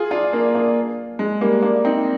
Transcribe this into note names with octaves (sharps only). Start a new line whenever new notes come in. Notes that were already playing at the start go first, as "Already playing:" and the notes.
Already playing: F4 G#4
D4 F4
A#3 D4
A#3 D4
G#3
G3 A#3
A#3 D4
C4 D#4